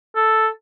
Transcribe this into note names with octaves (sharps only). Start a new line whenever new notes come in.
A4